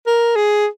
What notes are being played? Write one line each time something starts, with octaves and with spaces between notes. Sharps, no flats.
A#4
G#4